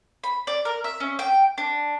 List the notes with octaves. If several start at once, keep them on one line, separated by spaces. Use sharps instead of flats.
B5
D5
A#4
E5
C#4
G5
D4